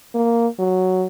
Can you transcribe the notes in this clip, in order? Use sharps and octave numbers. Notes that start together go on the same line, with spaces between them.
A#3
F#3